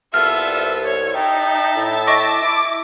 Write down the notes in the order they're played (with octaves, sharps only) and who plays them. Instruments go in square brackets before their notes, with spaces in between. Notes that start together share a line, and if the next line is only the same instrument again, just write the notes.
[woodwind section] C2 [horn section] B3 F4 A4 [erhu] E5 [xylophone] F6
[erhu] C#5
[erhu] D#4 [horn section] E5 A5 [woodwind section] G5
[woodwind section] A2 E4
[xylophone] D#5 C#6 A#6 [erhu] D6
[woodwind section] E4